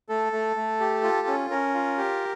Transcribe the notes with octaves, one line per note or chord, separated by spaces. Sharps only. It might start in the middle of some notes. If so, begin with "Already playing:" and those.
A3 A4
A3
A3
G4
F4
C#4
C#4 A#4
F4
G4